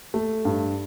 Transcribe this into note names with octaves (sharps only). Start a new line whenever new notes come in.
A3
G2